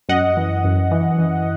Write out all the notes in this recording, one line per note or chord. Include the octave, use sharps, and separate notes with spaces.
F#2 D#5 F#5
E3
F#2
E3
E3